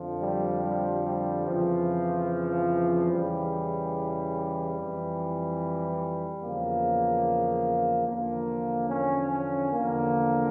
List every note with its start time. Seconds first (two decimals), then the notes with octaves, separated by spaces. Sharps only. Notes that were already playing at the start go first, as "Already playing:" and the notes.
Already playing: F2 D3 F3
0.22 G3
0.64 G3
1.05 G3
1.46 F2 C#3 E3 F3
3.11 E2 C#3 E3 G3
4.78 F2 E3
6.42 E2 C#3 F3 A#3
8.07 E2 D3 F3 A#3
8.89 C#4
9.32 C#4
9.72 E2 D3 F3 A#3